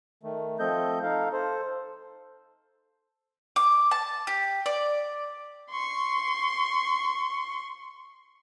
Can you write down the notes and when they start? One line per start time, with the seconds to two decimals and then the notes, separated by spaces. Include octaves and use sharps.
0.23 D#3 A3
0.59 F3 A3 C4 A4 D#5 G6
1.03 D#4 A4 F5
1.33 A4 C5
3.56 D6
3.91 A5
4.27 G4
4.66 D5
5.71 C6 C#6